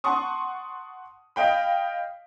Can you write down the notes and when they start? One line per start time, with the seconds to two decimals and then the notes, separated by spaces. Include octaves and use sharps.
0.04 F#5 A5 C6 C#6 D#6
1.36 D#5 F5 G5 B5